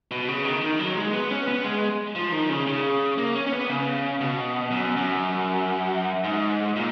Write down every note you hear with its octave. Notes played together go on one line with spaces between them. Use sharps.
B2
C#3
D#3
D#3
F#3
G#3
B3
C#4
B3
G#3
F3
D#3
C#3
C#3
A#3
C#4
C#4
B3
C#3
B2
F#2
F#2
G#2
A#2